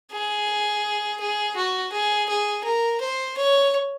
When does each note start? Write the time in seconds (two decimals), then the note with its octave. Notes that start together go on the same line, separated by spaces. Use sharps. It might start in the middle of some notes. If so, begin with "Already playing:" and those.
0.12 G#4
1.20 G#4
1.56 F#4
1.92 G#4
2.29 G#4
2.64 A#4
3.01 C5
3.37 C#5